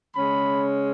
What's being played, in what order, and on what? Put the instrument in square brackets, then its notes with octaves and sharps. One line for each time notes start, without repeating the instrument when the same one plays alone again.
[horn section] C#3 G#3 C#4 B5